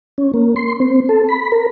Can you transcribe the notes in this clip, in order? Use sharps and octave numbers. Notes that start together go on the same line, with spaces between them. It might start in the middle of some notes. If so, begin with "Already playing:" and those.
C#4
A#3
C6
C4
A4
B5
A#4